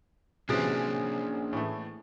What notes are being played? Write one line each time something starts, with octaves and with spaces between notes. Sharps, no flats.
C3 E3 F#3 A#3 C#4 D4 G#4 C5
A2 E3 A3